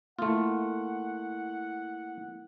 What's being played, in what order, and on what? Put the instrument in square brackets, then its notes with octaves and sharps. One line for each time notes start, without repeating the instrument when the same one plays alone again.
[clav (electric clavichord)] A3 F4 [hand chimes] A#3 E4 [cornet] F#5